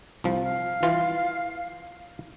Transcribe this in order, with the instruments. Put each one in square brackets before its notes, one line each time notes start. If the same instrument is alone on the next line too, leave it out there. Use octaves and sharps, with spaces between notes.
[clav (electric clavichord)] C2 F3
[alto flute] F5
[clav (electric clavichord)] E3 F4